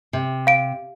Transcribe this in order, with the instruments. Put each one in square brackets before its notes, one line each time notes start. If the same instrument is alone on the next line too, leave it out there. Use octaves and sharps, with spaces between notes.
[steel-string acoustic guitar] C3
[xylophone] F5 D7